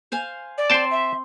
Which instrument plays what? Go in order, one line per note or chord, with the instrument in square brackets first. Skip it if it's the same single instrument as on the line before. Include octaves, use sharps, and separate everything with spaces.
[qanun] C5 F5 G#5
[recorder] D5
[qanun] C4 C6 [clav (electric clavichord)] C5 G5 A5
[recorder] E5